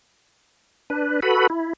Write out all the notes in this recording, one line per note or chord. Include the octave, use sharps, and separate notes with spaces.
D4 B4
F#4 A4 B4 B5
E4